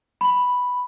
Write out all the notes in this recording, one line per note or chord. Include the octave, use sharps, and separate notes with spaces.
B5